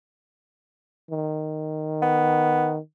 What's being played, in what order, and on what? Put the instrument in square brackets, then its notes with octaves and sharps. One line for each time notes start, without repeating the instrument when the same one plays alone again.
[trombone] D#3
[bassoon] B3